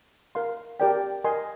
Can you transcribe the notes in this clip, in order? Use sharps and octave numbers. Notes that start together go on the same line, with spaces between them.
A#4 F5 C6
G4 A#4 D5 G5
A#4 D#5 G#5 C6